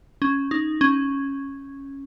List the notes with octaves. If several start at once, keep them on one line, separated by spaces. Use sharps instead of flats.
C#4
D#4
C#4